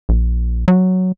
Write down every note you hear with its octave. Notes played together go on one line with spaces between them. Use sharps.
A#1
F#3